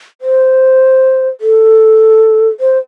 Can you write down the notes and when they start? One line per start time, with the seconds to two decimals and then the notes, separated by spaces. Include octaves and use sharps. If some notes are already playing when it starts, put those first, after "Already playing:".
0.21 C5
1.41 A4
2.60 C5